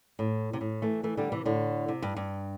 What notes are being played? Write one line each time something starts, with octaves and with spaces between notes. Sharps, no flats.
A2
C3
A2
E3 A3
E3 A3
D3 G3
C3 E3
A2 D3
C3
G2
G2